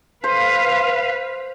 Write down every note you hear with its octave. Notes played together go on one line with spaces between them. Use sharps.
B4 C5 F5